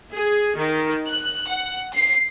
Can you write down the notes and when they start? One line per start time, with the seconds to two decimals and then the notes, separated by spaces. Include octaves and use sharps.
0.11 G#4
0.57 D#3
1.08 F#6
1.48 F#5
1.93 C7